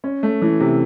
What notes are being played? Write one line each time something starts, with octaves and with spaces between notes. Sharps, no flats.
C#4
A3
E3
C3